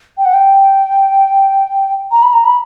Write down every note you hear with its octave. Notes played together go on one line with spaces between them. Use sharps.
G5
F#5
G5
A#5
B5
A#5
B5